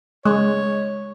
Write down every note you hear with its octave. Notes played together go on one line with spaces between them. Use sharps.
G#3 C#5